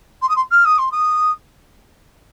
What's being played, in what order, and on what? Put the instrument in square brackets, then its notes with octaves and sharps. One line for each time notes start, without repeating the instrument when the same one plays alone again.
[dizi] C6
D#6
C6
F6
D#6
C6
D#6